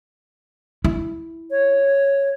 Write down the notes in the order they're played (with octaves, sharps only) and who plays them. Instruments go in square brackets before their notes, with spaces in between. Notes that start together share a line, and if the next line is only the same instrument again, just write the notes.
[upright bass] E4
[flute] C#5